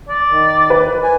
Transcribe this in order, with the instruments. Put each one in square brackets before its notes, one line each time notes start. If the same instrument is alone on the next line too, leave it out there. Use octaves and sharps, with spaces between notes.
[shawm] D5
[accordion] D#3
[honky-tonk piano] B4
[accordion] G#5